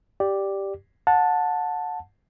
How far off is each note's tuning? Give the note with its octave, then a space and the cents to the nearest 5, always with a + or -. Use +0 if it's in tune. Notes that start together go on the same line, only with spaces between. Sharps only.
G4 +0 D5 +0
F#5 -25 A5 +0